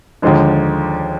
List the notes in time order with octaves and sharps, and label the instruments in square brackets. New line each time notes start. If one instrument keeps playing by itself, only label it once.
[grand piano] D#2 D3 F3 G#3 D4